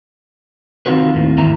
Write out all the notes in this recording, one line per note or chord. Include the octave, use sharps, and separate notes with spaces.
D#3 C4 D#4 F4 F#4 B4
D#2 A2
D#2 G#2 E3 E4 A#5